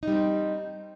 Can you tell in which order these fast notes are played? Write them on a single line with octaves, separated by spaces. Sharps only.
D#4 G3 C4